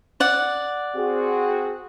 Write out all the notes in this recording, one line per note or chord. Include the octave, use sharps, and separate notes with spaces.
D5 F#5
C4 F#4 G#4